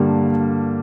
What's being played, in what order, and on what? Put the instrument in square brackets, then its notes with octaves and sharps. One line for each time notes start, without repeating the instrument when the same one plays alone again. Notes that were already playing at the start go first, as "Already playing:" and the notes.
Already playing: [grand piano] G2 D3 G3 A#3